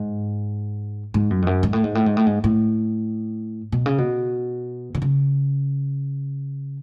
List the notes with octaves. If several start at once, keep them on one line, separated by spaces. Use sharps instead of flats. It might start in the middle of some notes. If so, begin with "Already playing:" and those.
Already playing: G#2
G#2
F#2
F2
F#2
G#2
A2
G#2
A2
G#2
A2
G#2
A2
B2
C#3
B2
D3
C#3